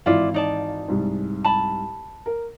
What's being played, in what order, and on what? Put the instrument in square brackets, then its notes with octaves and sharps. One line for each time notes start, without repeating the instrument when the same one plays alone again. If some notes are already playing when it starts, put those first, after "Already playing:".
[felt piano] G#1 E3 F5 [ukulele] E4 F4 D5
[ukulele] D#4 D5 A5
[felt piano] C2 G#2
[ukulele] A5 B5
[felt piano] A#4